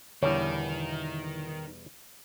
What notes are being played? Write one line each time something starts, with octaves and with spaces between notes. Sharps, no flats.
E2 B2 D3 D#3 G3 E4 C#5